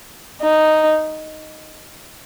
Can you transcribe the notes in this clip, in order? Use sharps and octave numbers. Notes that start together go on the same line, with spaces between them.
D#4